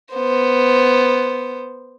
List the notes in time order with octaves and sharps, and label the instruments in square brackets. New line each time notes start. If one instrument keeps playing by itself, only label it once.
[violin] B3 C5